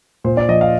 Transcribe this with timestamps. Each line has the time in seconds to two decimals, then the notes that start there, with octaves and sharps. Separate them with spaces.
0.24 A#2 C5
0.37 D5
0.49 F3 D#5
0.61 F5